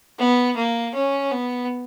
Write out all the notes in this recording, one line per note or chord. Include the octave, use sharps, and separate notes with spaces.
B3
A#3
C#4
B3